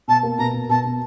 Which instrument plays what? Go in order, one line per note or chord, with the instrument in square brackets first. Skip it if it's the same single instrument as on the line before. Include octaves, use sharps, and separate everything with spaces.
[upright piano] B2 [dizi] A5
[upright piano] A#3
[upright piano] B2 [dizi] A#5
[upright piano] B2
[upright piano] B2 [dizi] A5
[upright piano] B2